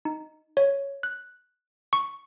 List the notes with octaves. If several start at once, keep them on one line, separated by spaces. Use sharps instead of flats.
D#4
C#5
F#6
C#6